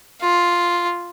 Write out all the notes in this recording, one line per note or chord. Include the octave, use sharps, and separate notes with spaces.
F4